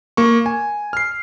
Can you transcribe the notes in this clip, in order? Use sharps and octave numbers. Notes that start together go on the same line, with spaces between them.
A#3 C#6
G#5
F6 C7